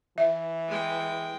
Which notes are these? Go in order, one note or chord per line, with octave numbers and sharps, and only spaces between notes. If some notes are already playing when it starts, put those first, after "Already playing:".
E3 E5
G#3 G5